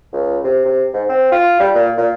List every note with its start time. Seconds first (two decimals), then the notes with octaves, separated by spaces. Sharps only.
0.13 C#2
0.44 C3
0.65 C3
0.94 G#2
1.09 C4
1.32 F4
1.60 G3
1.75 A#2
1.98 A#2